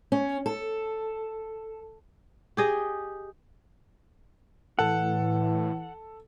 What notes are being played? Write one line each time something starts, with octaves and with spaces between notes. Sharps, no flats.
C#4
A4
G4 G#4 D#5
A2 E3 A4 F#5